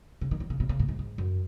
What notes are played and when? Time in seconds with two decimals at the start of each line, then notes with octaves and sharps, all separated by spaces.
0.21 C#3
0.31 D#3
0.40 E3
0.50 C#3
0.60 C3
0.69 C#3
0.79 A2
0.88 G#2
0.99 G#2
1.18 F#2